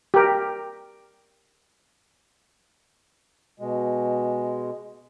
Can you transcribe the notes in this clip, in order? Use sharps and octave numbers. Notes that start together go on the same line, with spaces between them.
G4 A#4
B2 G#3